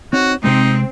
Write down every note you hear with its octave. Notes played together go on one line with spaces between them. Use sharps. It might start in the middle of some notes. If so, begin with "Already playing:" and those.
C4 D#4 F#4 C#5
C3 G#3 C4 D#4